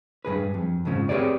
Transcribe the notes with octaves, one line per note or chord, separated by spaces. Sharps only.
G2 A#2 G#4 B4
F2
F2 G#2 C#3 F3
C4 G4 G#4 B4 C#5 D5